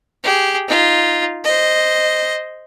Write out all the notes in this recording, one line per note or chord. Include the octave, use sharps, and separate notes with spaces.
G4 G#4
D#4 F4
C5 D#5